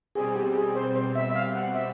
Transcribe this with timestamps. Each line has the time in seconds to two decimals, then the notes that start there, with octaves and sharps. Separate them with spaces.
0.15 B2 G3 C4 G#4
0.36 G4
0.55 G#4
0.75 C5
0.95 C5
1.15 E5
1.30 E5
1.35 F5
1.55 F#5
1.74 E5